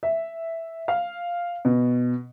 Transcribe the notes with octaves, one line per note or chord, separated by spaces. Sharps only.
E5
F5
B2